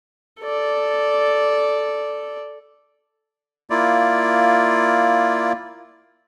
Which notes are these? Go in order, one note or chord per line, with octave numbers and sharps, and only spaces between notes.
A4 D5
A#3 E4 F4 D5